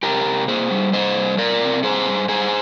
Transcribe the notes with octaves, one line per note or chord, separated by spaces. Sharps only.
C3 G4 A#4
C3
A#3 G#4 C5
G3
C3 C5 D#5
G3
C3 A#4 D5
C3
G2 G#4 C5
G2
G2 G#4 C5